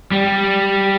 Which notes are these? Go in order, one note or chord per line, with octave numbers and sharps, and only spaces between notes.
G3